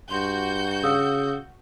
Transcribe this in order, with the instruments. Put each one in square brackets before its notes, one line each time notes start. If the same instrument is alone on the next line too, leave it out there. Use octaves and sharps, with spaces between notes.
[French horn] G2 [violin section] F#4 G6 [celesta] C6
[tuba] C#3 [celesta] F5 D#6 E6